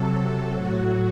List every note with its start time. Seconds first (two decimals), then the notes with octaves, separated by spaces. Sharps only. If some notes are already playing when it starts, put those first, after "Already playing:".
Already playing: C3 F#3 A4
0.50 A2 F#3 F#4